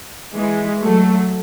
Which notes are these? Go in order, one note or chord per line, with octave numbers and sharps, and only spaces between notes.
E3 G#3
F#3 A3